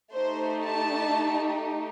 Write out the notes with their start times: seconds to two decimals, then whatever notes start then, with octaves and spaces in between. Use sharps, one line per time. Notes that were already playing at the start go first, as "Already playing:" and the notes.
0.13 A3 D#4 G4 C5
0.64 A5